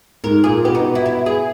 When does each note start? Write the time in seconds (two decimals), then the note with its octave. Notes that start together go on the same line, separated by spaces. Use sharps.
0.24 G#2 G#3 A#4
0.44 A#2 A#3 G#4
0.65 B2 B3 G4
0.75 D#4
0.95 E4
1.05 E4
1.26 G#4